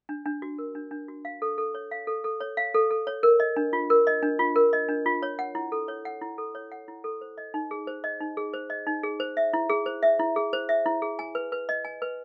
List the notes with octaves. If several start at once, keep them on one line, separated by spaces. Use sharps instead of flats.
D4
D4
F#4
A#4
D4
D4
F#4
F5
A4
A4
C#5
F5
A4
A4
C#5
F5
A4
A4
C#5
A#4
D#5
D4
F4
A#4
D#5
D4
F4
A#4
D#5
D4
F4
C#5
F#5
E4
A4
C#5
F#5
E4
A4
C#5
F#5
E4
A4
C5
D#5
D#4
G#4
C5
D#5
D#4
G#4
C5
D#5
D#4
G#4
C5
E5
E4
G#4
C5
E5
E4
G#4
C5
E5
E4
G#4
G#5
B4
B4
D#5
G#5
B4